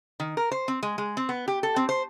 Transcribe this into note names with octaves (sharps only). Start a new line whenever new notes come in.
D#3
A#4
C5
C4
G#3
G#3
C4
B3
G4
A4
C4
C5